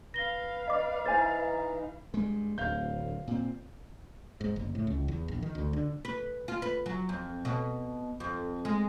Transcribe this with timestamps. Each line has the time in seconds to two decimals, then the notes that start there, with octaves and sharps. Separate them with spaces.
0.14 B4 F5 A#6 G7
0.68 D5 D#5 D6
1.06 E3 D#4 C5 G#5 A6
2.14 G2 G#3
2.58 D1 D2 F5 G6
3.27 A#2 C4
4.41 G#2
4.56 F#1
4.75 A2
4.87 C#2
5.08 E2
5.28 A#1
5.42 D#3
5.55 D2
5.73 D3
6.05 B4
6.48 F4
6.62 B4
6.86 F#3
7.09 F2
7.45 B2
8.20 F2
8.65 G#3